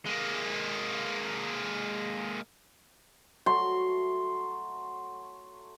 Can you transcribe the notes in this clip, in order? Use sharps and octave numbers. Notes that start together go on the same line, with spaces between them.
G#3 A#3
F#3 A3 F#4 C6